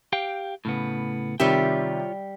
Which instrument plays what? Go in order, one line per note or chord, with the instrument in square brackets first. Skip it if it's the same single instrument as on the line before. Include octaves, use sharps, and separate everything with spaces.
[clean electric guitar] G4 F5 G5
A2 C#3 B3
[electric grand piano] C3 D#3 G4 [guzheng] G3 E5 [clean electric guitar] F4 C#5 G5